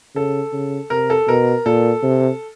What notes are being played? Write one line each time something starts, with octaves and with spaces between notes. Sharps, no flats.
C#3 A4
C#3
C3 A#4
A4
B2 A#4
A#2 A4
C3